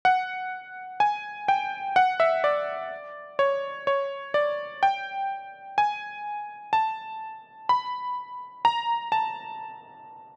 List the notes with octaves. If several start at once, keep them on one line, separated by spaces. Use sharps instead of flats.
F#5
G#5
G5
F#5
E5
D5
C#5
C#5
D5
G5
G#5
A5
B5
A#5
A5